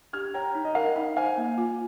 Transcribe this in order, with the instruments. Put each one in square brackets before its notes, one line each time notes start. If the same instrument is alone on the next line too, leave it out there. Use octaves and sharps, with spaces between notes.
[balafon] G4 [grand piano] F6 G#6
[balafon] C#5 [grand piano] G5 A#5
[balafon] D#4
[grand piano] D#5
[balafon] A#4 [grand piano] F5
[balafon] D#4
[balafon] C5 [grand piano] F5 G#5
[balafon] A#3
F4